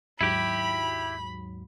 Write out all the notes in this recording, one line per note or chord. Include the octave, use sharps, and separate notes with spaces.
D#2 G#2 F#3 E4 G4 B5